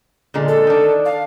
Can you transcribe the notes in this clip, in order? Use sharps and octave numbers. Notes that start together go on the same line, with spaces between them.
A#2 D3 G#3
A4
D#3 D4
F5